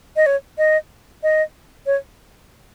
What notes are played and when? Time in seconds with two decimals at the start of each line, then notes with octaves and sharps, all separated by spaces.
0.16 D#5
0.26 C#5
0.58 D#5
1.23 D#5
1.86 C#5